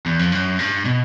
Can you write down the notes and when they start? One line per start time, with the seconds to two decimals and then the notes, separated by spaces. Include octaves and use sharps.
0.06 E2
0.19 F2
0.32 F#2
0.59 G2
0.85 B2